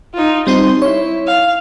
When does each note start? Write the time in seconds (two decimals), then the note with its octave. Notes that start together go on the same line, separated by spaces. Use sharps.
0.14 D#4 F4
0.47 G3 C4 D#4 C6
0.82 E4 C#5
1.27 F5